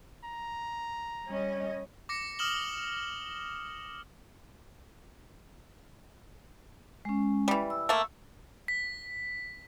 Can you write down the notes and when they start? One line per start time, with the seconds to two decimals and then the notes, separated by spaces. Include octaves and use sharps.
0.24 A#5
1.27 G3 C#4 D#5
2.09 D6 A#6 C#7
2.39 D#6 F6 E7 F#7 G7
7.05 G#3 C#4
7.48 E3 G3
7.70 E6
7.89 A3 A#3
8.68 B6